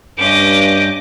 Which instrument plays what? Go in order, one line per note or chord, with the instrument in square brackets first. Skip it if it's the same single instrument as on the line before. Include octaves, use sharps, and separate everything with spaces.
[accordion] G2 G6 [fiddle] C#4 D#5 [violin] D6